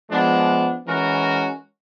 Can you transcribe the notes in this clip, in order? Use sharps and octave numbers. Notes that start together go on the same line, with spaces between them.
F3 G#3 B3 D4
E3 G#3 C#4 F#4 A#4